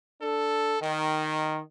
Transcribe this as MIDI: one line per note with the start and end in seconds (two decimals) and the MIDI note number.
0.21 0.76 62
0.21 0.76 69
0.80 1.60 51